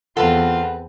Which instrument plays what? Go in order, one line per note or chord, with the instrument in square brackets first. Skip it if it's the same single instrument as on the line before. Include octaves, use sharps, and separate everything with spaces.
[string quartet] E2 C4 [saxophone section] F4 [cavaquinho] A4 B4 A5 [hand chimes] F#5